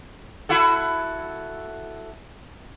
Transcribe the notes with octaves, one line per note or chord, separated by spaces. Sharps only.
E4 F#4 A4